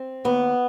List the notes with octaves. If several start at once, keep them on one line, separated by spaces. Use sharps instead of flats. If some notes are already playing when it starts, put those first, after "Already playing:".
Already playing: C4
D#2 B3